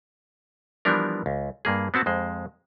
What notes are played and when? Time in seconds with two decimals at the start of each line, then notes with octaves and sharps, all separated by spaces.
0.85 E3 F3 G3 B3 D4 A#4
1.26 C#2
1.65 G2 A#3 G#4
1.94 B3 C4 F#4 A5
2.06 F2 G#3 C5